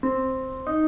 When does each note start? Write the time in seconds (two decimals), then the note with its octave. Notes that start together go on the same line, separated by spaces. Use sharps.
0.03 C4
0.67 D#4